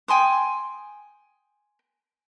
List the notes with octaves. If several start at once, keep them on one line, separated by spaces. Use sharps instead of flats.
G5 G#5 C6 D#6